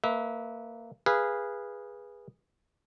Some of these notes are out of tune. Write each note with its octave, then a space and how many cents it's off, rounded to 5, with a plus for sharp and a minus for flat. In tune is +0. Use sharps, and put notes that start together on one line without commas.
A#3 -20 B4 +0 E5 -25
G#4 -15 B4 -15 F5 -20